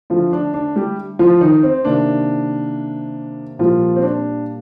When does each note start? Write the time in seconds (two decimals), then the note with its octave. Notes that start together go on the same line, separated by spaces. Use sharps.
0.10 D3 F3 A3 F4
0.33 D4
0.54 D4
0.76 G3 G4
1.19 F3 F4
1.41 D#3 D#4
1.63 C4
1.85 C3 D#3 A#3 D4
3.59 A#2 F3 G3 A#3 F4
3.96 C4
4.02 D4